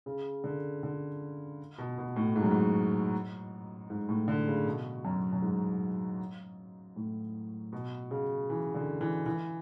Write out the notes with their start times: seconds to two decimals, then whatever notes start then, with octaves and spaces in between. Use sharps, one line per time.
0.06 C#3
0.44 D3
0.83 D3
1.78 B2
1.98 B2
2.16 A2
2.36 G#2
2.43 F#2
2.51 G#2
3.90 G#2
4.09 A2
4.28 D3
4.47 C#3
4.66 B2
5.05 F#2
5.33 F#2
5.42 G#2
6.96 A2
7.73 B2
8.11 C#3
8.50 E3
8.74 D3
9.01 E3
9.26 E3